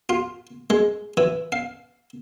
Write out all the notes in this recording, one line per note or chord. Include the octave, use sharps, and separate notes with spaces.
F4
G#3
E3
F5